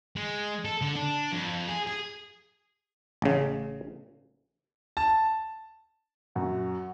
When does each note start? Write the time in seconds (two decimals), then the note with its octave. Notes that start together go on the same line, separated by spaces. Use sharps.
0.16 G#3
0.65 A4
0.82 D3
0.96 D4
1.33 F2
1.69 G#4
1.87 G#4
3.22 A1 C#3
4.97 A5
6.36 F#2 F#4